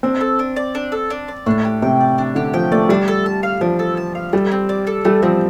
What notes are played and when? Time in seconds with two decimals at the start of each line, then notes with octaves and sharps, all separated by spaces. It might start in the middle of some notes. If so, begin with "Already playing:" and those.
0.03 C4 D4
0.21 A4
0.39 D4
0.56 D5
0.75 D4
0.92 A4
1.10 D4
1.28 D5
1.46 A2 D4
1.64 G4
1.82 C3 G5
2.00 D5
2.18 D4
2.35 D3 G4
2.54 F3 G5
2.72 A3 D5
2.89 G3 D4
3.08 A4
3.26 A5
3.43 F5
3.61 F3 D4
3.79 A4
3.97 A5
4.15 F5
4.33 G3 A3
4.51 C4
4.69 D5
4.87 A4
5.05 G3 A3
5.22 F3 C4